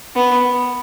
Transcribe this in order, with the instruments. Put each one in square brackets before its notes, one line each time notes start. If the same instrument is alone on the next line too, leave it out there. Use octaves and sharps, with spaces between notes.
[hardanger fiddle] B3